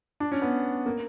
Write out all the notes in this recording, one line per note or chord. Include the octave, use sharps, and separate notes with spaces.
D4
C#4
B3
A#3